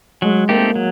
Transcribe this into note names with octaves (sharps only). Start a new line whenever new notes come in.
F#3 G#3
A3 A#3 C4 D#4 G4
F#3